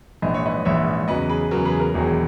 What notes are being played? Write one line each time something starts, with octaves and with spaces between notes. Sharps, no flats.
A#1 G#2 E3 D#5
C#5
B4 D#5
A#1 G#2 E3 C#5 E5
E2 C#3 F#3 B4 D#5
G#4 B4
E2 C#3 F#3 A#4
G#4 B4
A#4
E1 E2 D#3 F#3 G#4